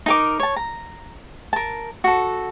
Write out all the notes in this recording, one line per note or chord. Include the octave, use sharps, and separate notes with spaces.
D#4 A#4 D6
C#5 A5
A#5
A#4 A5
F#4 A4